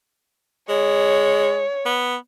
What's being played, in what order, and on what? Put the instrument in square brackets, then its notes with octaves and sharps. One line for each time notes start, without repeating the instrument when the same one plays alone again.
[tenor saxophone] G#3 [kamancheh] C#5
[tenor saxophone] B3